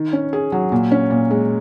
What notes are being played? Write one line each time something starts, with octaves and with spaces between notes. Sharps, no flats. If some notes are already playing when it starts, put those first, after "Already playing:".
Already playing: D#3
C#4
G#4
F#3
A#2
C#4
A#2
G#3